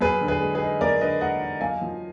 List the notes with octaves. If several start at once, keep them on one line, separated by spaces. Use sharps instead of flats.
F#2 G#4 B4
D3
G#4 B4
G#3
G#4 B4
D#4
F#2 A#4 D5
D3 B4 D#5
G#3 D#5 F#5
D#4
F#2 F5 G#5
F3